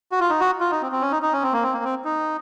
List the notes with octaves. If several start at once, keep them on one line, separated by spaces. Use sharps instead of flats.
F#4
F4
D#4
F#4
F4
D#4
C4
C4
C#4
D#4
D#4
C#4
C4
A#3
C4
A#3
C4
D#4